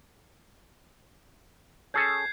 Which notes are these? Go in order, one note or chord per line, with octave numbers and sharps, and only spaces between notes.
C#4 G#4 A4 G6 G#6 C7